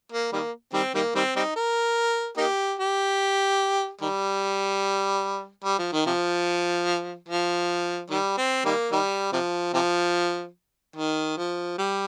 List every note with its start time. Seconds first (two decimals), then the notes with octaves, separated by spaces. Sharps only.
0.12 A#3
0.33 D#3 G3 A#3
0.73 D#3 G3 C4
0.95 D#3 G3 A#3
1.15 D#3 G3 C4
1.36 G3 C4 D#4
1.56 A#4
2.37 A#3 D#4 G4
2.79 G4
4.01 D#3 G3
5.64 G3
5.79 F3
5.93 D#3
6.06 C3 F3
7.29 F3
8.10 D#3 G3
8.38 C4
8.65 D#3 G3 A#3
8.92 D#3 G3
9.33 C3 F3
9.74 C3 F3
10.96 D#3
11.37 F3
11.78 G3